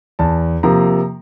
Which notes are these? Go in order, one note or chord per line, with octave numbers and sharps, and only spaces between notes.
E2 A5
C3 F3 A#3 A#5